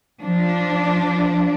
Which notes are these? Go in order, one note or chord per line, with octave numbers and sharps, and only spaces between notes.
F3 D4